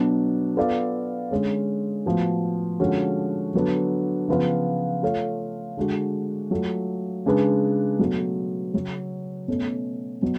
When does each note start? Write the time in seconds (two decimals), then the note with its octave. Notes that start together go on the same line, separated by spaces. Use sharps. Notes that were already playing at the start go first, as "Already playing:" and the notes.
Already playing: B2 F#3 B3 D4 F#4
0.57 B3 F4 A4 D5 F5
1.31 D3 G#3 C#4
2.06 A2 F3 B3 F#4
2.80 D3 F3 G#3 C#4 F#4
3.54 D3 F#3 B3 D4
4.28 C#3 F3 B3 F4 B4
5.02 A3 F4 A4 C#5 F5
5.77 D3 G#3 D4 F#4
6.51 F#3 A3 F4
7.26 C#3 G#3 D4 G#4 B4
7.99 B2 F#3 A3
8.74 C#3 F#3 C#4 F#4
9.48 B2 A3 C#4
10.22 B2 F#3